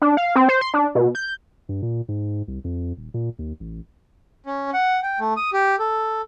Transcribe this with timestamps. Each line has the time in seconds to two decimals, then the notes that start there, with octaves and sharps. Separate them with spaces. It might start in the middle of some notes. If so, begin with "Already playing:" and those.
0.02 D4
0.17 F5
0.36 C4
0.49 C5
0.61 C6
0.74 D4
0.95 B2
1.15 G6
1.69 G2
1.82 A#2
2.09 G#2
2.48 C2
2.64 F2
2.97 D#1
3.14 A#2
3.39 D#2
3.60 A1
4.46 C#4
4.74 F#5
5.03 G5
5.20 A3
5.37 D#6
5.53 G4
5.79 A4